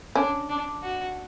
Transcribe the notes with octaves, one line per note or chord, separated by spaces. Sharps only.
C#4 D4
D4
F#4